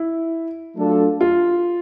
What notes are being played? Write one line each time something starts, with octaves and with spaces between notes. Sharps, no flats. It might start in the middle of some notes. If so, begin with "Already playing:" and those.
Already playing: E4
F#3 A3 D4 F4 A4
F4